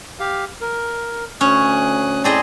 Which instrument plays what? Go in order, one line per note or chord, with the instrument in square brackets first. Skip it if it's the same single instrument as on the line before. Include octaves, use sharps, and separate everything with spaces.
[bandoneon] G4 F5
A#4
[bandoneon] D2 D#6 F#6 [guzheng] C#4
[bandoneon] A2 D5 A5 [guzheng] C4 G#4 D#5